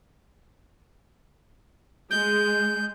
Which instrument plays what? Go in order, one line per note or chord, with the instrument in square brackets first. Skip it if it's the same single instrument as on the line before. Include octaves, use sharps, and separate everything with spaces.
[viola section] G#3 [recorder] G6